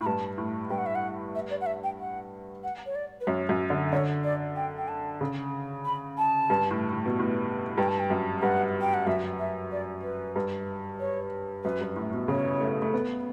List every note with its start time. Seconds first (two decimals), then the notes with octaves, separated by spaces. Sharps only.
0.01 A2 B5
0.06 G2 A5
0.38 A2
0.70 G2 G5
0.78 F#5
0.86 E5
0.95 F#5
1.35 E5
1.50 D5
1.61 F#5
1.66 E5
1.84 G5
2.00 F#5
2.64 F#5
2.86 C#5
2.95 D5
3.21 B4
3.27 F#2 C#5
3.49 F#2
3.70 D3
3.93 D3 C#5
4.24 D5
4.56 G5
4.78 G5
4.88 A5
5.21 C#3
5.85 B5
6.18 A5
6.50 G2
6.71 A2
6.93 A2
7.06 B2
7.19 A2
7.78 G2 G5
7.89 A5
8.00 G5
8.10 F#2
8.42 G2 F#5
8.81 G5
8.94 F#5
9.07 F#2 E5
9.39 E5
9.72 D5
10.03 B4
10.36 G2
11.00 C#5
11.64 F#2 B4
11.81 G2
11.96 A2
12.13 B2
12.28 C#3 C#5
12.61 A3
12.82 A3
12.94 B3